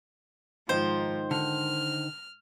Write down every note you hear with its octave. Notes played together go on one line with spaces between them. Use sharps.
G#2 D#3 F3 D#4 C5
D3 F6